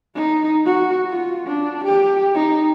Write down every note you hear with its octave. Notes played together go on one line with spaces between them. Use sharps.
D#4
F#4
F4
D4
G4
D#4